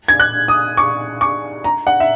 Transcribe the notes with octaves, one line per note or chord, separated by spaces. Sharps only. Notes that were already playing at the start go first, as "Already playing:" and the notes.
G#6
F#6
D#6
C#6
C#6
A#5
F#5
E5